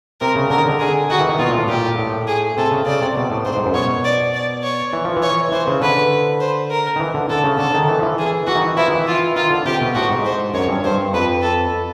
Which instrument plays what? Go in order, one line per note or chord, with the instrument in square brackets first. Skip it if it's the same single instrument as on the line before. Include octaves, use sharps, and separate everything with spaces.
[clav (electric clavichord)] C3 [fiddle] A#4
[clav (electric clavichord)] C#3
[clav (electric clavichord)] D3 [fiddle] A#4
[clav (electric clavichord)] D#3
D3
[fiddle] G#4
[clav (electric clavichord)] D#3 [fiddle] F#4
[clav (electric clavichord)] E3
D#3
[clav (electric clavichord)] B2 [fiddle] F4
[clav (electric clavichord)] A#2
A2
[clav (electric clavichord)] A#2 [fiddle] G4
[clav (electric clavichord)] A2
[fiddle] G#4
[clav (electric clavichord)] C3 [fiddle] A4
[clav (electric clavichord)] C#3
[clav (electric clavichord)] C#3 [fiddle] D5
[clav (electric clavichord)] C3
B2
A2
[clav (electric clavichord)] G#2 [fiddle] C5
[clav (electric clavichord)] G#2
F#2
[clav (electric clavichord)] B2 [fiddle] C#5
[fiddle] D5
D5
C#5
[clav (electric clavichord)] E3
F3
E3
[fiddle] C#5
[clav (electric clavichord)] E3 [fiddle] C5
[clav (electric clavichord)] C#3
[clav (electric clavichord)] D3 [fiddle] B4
[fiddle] C5
A#4
[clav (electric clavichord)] D#3
E3
D3
[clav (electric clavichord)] D3 [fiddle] A4
[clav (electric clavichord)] C#3
[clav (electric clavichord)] D3 [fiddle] A4
[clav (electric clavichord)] D#3
E3
F3
E3
[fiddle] G#4
[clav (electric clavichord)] E3 [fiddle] F#4
[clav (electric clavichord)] D#3
E3
[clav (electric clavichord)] F3 [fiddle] E4
[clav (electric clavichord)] D#3
E3
[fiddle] F4
[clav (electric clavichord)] D#3 [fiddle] F4
[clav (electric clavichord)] D3
[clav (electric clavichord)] C3 [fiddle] G4
[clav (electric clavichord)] B2
[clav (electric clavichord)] A2 [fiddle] F#4
[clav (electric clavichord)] G#2
[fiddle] C5
[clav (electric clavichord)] F#2 [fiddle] C#5
[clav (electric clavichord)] G2
[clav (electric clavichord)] G2 [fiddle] C5
[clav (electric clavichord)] F2 [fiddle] B4
[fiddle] A4